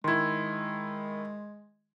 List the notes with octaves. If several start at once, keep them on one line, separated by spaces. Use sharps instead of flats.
D#3 G#3 E4 C6 G#6